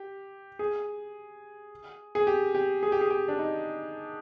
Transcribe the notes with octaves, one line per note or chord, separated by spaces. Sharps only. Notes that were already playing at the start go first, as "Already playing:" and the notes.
Already playing: G4
G#4
G#4
G4
G4
G#4
G4
G#4
G4
D4
D#4